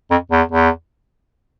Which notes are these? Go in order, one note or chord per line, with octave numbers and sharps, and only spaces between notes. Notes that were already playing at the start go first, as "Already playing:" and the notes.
F2
E2
E2